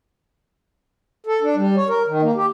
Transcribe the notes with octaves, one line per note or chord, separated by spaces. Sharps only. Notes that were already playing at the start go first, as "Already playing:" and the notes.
A4
D4
G3
C#5
A#4
D#3
A#3
G4